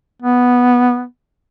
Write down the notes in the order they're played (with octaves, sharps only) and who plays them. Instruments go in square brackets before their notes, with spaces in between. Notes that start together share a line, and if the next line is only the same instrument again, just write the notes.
[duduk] B3